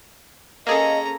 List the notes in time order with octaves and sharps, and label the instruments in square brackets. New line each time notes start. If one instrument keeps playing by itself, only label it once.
[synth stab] A#3 G#4 A4 [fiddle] C#4 A#5 [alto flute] D#5